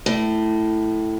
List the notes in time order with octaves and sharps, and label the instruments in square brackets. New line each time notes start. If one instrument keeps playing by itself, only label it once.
[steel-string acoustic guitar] A2